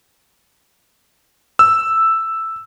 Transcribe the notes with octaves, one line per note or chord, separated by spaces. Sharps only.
E6